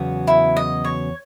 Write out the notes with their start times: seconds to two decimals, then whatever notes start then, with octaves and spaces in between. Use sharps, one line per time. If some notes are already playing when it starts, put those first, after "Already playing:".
Already playing: E2 C#3 F#3 B3 F#4
0.27 E4
0.56 D#5
0.84 C#5